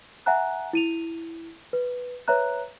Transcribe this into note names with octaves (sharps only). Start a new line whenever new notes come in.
E5 F#5 G#5 A#5 F#6
E4 D#7 F7
B4
B4 C#5 E5 A#5 F#6